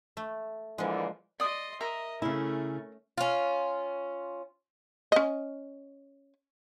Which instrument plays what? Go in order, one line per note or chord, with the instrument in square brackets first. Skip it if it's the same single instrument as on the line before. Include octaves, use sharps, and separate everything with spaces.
[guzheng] A3
[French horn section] A#2 D3 E3 [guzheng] F3 G#3
[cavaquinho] D5 D#6 [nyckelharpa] D#5 C6
[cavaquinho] A#4 E5 A#5 [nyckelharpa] D#5
[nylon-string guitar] C#3 E4 [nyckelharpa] A3 C#4
[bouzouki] C#4 F4
[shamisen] C#4 D#5